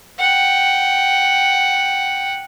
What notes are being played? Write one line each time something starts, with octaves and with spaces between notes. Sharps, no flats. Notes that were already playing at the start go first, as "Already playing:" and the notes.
F#5 G5